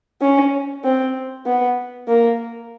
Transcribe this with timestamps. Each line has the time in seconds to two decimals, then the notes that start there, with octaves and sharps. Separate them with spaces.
0.21 C#4
0.84 C4
1.46 B3
2.08 A#3